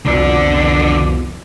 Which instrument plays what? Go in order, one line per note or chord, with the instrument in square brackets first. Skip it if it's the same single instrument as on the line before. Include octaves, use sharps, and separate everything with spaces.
[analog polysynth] C2 F2 B2 [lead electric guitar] D3 D5